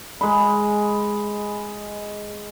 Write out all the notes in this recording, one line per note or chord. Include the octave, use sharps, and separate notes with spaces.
G#3 B5